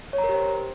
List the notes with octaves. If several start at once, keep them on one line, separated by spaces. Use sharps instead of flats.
C#5
A#5
A#4
G4
C5